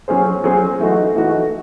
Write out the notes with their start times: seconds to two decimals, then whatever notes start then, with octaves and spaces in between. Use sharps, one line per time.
0.08 F#3 C#4 G#4 C5
0.44 F#3 C#4 G#4 C5
0.79 E3 A3 D#4 F#4
1.16 E3 A3 D#4 F#4